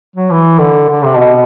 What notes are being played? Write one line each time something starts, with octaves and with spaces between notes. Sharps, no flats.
F#3
E3
D3
D3
C3
B2